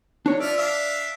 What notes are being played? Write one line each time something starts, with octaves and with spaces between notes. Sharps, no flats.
D4 D#4 C#5
F3 D5 E5 F6
D4 E5 F5